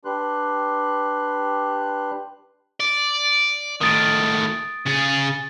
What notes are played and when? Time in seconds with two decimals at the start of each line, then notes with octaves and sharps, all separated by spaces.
0.05 D4 G4 B4 C6 F#6
2.80 D5
3.81 A2 D#3 D#6 A6 D7
4.87 C#3 G#4 A6